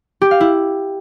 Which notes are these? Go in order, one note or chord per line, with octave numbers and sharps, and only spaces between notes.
G4
F5
E4